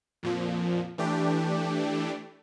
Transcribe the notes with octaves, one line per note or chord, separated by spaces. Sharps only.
F2 A#2 F3
E3 A3 D4 G4